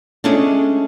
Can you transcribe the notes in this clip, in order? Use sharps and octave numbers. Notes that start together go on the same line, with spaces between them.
G#3 A3 C#4 D4